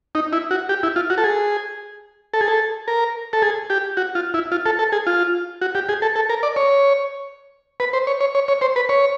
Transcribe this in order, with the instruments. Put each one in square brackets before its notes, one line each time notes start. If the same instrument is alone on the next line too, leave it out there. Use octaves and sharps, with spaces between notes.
[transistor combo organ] D#4
E4
F#4
G4
E4
F4
F#4
A4
G#4
A4
G#4
A4
A#4
A4
G#4
G4
F#4
F4
E4
F4
A4
A4
G#4
F4
F#4
G4
G#4
A4
A4
A#4
D5
C#5
B4
C5
C#5
C#5
C#5
C#5
C5
B4
C#5